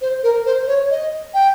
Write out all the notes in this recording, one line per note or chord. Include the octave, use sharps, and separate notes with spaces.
C5
A#4
C5
C#5
D#5
G5